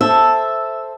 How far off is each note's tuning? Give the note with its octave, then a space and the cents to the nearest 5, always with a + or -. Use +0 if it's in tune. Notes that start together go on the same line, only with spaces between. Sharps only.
A4 +0 C5 +5 E5 +0